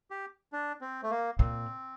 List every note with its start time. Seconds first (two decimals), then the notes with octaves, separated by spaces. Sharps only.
0.11 G4
0.52 D4
0.81 C4
1.03 A3
1.11 A#3
1.38 A#2 C4